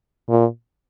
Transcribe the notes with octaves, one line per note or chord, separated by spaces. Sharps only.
A#2